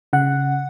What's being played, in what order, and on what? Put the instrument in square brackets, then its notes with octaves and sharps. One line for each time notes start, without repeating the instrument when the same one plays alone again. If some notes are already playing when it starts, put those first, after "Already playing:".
[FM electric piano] C#3 F#5